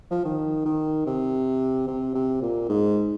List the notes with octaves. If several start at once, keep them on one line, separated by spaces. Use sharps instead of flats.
F3
D#3
D#3
C3
C3
C3
A#2
G#2